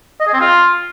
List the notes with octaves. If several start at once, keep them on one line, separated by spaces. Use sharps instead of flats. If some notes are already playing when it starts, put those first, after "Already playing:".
D#5
G#4
C4
F4